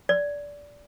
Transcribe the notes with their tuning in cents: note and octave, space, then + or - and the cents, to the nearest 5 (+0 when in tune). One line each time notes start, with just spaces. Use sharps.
D5 -15